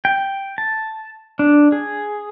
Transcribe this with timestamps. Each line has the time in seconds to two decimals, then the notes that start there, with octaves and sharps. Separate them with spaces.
0.05 G5
0.58 A5
1.39 D4
1.72 G#4